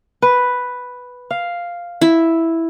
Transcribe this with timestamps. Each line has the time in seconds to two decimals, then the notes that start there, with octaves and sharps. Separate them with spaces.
0.22 B4
1.31 F5
2.01 E4